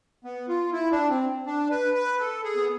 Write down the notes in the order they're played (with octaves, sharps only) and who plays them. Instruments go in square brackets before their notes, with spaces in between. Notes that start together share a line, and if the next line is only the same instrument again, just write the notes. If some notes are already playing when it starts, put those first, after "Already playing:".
[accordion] B3
F4
E4
D4
C4
D4
B4
B4
A4
G#4
B3